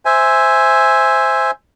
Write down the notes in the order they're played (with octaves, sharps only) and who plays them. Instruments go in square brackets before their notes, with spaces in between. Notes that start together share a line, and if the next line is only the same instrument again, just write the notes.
[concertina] C5 E5 G#5